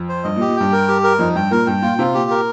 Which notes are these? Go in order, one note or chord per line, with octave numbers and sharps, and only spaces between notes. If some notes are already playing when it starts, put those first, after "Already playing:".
Already playing: F2
C5
G2 D#5
A#2
G4
A#2
G2 G5
A#4
G4
A#4
F2 D#4
G2 G5
A#2 A#4
G2 G5
A#2 F4
C3 F4
A#2 G4
A#4